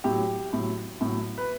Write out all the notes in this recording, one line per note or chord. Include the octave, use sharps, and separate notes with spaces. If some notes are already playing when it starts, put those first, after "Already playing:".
A2 F#3 G4
A2 F#3
A2 F#3
B4